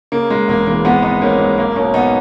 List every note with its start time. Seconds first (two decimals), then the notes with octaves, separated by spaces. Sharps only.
0.12 C#3 A#3
0.30 C#3 G#3
0.48 E1 A#3
0.67 E3 A#3
0.84 G#1 G#3 B3
1.02 G#1 B3 D#4
1.21 G#1 A#3 C#4
1.39 G#2 G#3
1.58 B1 A#3
1.76 B2 A#3 C#4
1.94 B1 B3 D#4